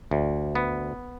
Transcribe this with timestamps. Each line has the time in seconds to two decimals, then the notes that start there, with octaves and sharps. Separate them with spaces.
0.11 D2
0.55 B3